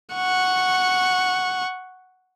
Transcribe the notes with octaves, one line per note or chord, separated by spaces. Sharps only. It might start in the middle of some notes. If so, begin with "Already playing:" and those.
F#5 C#6